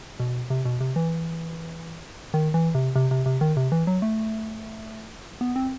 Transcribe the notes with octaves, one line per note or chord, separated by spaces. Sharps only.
B2
C3
B2
C3
E3
D#3
E3
C3
C3
C3
C3
D#3
C3
E3
F#3
A3
B3
C4